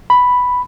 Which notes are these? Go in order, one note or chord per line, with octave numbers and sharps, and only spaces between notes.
B5